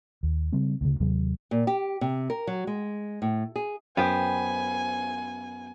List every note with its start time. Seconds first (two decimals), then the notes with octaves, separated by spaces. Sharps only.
0.23 D#2
0.52 C#3 G3 G#3 C4
0.81 D2 C#3
1.00 D#2 C3 F#3 G#3
1.51 A#2
1.67 G4
2.01 C3
2.30 A#4
2.47 F#3
2.67 G#3
3.22 A2
3.56 G#4
3.97 F#2 B3 C5 G5 G#5